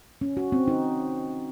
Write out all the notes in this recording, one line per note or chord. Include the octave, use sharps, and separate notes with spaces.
C#4
F#4
C4
D#4